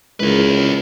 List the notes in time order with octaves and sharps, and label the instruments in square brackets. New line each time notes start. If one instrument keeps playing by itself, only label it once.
[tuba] C#2 [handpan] G#3 E4 A#4 [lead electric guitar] G#4 B4